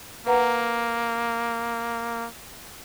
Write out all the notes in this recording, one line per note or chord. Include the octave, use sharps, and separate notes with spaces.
A#3 B4 F#5 A#5